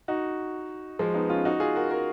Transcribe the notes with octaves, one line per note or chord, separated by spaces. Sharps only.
D#4 F#4
F3 G#3
B3 D#4
C#4 F4
D#4 F#4
F4 G#4
F#4 A#4
F#4 A#4